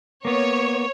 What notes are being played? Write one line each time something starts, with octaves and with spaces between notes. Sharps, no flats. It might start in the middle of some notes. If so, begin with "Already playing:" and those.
A#3 B3 C#5